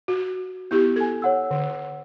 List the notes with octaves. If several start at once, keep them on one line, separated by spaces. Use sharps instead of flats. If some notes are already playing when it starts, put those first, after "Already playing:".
F#4
B3 E4 G4 G6
A4 G#5 G#6
C#5 F#5 E6
D3